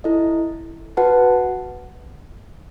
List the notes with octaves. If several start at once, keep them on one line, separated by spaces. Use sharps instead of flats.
E4 A4 D#5
F#4 B4 F#5 A5